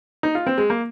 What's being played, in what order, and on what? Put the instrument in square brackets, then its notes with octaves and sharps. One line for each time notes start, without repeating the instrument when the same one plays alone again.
[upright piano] D#4
F4
C4
G#3
A#3